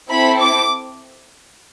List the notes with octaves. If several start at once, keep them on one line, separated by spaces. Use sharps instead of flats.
C4 E4 A4 B5
D6